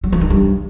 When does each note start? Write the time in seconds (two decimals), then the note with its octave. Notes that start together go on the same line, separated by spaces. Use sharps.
0.04 F#3
0.12 F3
0.21 D#3
0.30 G2